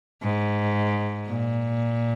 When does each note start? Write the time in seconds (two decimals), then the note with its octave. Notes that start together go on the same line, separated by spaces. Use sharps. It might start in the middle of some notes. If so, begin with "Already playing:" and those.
0.23 G#2
1.27 A#2